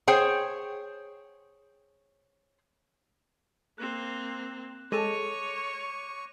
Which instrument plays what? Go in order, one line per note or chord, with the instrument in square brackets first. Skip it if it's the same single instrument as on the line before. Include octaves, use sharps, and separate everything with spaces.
[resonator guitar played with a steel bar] G#4 C5 C#5 G5
[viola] A#3 C4 [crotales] F#6 E7
[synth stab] G#3 A4 A5 [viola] C#5 [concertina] C#6 [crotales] D6 A#6 D#7